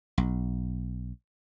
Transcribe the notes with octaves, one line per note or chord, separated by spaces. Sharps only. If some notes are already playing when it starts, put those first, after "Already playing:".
B1